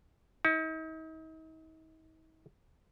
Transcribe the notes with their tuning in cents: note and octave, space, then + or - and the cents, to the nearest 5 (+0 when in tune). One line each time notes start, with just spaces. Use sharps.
D#4 +40